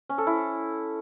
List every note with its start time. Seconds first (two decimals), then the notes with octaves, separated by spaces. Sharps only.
0.09 C#4
0.18 A4
0.27 E4